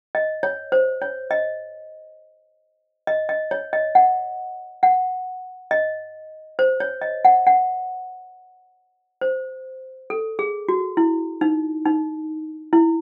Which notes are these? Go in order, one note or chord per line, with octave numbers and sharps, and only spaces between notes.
D#5
C#5
C5
C#5
D#5
D#5
D#5
C#5
D#5
F#5
F#5
D#5
C5
C#5
D#5
F#5
F#5
C5
A4
G#4
F#4
E4
D#4
D#4
E4